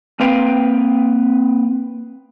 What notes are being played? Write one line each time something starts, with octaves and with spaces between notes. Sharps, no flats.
A#3 C4 B4 F5 G5